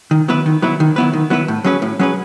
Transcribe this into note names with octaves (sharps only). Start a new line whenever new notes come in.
D#3
F#3 B3 E4 B4
D#3
F#3 B3 E4 B4
D#3
F#3 B3 E4 B4
D#3
F#3 B3 E4 B4
A2
F#3 C#4 G#4 B4
A2
F#3 C#4 G#4 B4